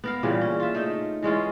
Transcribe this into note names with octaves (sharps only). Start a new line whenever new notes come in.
B3 A#4 F5
A#2 C#3 E3 G3
C#4
F4 E5
A3 D#4
E3 G#3 C#4 F4